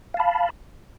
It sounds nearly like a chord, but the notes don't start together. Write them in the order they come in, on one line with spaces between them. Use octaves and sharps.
F5 A5 B5